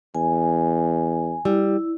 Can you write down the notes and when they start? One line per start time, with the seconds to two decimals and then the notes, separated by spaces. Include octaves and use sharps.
0.15 E2 G#5
1.45 G3 E4